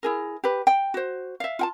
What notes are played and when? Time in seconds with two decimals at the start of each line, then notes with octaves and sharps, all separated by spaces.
0.03 E4 G#4 A#4
0.44 G4 B4
0.67 G5
0.94 F#4 C5
1.40 E5 F5
1.59 F4 G5 A5